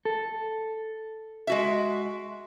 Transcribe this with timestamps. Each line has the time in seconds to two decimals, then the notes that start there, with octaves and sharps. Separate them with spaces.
0.05 A4
1.47 G#3 F#4 E5